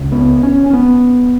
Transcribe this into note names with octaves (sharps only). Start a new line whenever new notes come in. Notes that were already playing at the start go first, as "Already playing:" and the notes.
Already playing: C#2 C#3
B3
C#4
C#4
B3